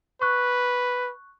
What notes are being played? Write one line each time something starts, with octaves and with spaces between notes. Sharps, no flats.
B4 C#6 F#6